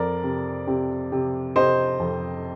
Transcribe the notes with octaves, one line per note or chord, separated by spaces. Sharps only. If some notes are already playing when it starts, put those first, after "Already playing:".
Already playing: F2 A#4 D5
C3
C3
C3
C3 C5 D#5
F2